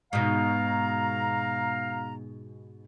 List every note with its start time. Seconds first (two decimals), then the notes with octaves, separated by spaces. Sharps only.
0.13 G#2 B2 F5 A#5